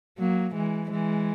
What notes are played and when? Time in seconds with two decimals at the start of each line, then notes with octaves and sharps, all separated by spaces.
0.19 F#3 A#3
0.55 E3 G#3
0.91 E3 G#3